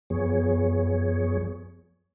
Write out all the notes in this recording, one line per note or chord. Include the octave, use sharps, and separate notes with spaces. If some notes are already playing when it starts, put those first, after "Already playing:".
F#2 F3 B3 G#4 C#5